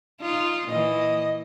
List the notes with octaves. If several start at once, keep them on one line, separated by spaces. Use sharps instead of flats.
D#4 F4
A#2 E3 D#5